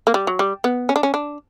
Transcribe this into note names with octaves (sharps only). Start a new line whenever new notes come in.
A#3
G3
F#3
G3
B3
C#4
D4
C#4
D4